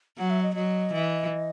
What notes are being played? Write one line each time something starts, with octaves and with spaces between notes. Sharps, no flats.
F#3 F#5
E5
D#5
F#3 D#5
E3